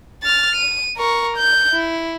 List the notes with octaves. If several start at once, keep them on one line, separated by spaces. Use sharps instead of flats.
F6 A6
D#7
A#4 C#6
G6
E4